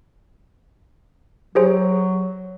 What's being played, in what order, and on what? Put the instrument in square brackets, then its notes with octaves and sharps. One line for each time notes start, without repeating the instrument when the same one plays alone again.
[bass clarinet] F#3 [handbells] G4 G#4 C5